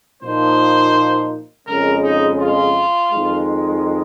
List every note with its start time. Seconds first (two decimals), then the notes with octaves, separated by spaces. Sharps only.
0.22 A#2 F3 A#3 D#4 C5
1.67 F2 C#3 G#3 C#4 A#4
2.03 D#4
2.39 F4
3.11 F2 D#3 G#3